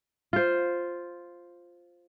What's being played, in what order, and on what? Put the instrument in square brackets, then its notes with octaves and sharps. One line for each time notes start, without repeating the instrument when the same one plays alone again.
[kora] F4 C5